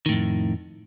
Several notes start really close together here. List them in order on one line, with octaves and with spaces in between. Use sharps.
D#3 A2 F2